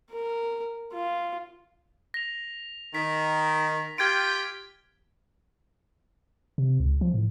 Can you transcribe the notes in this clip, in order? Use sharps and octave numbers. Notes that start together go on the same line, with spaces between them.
A#4
F4
A#6 F7
D#3 B6
F4 G4 G5 F6 G#6 D7
C3
C#2
F3
A2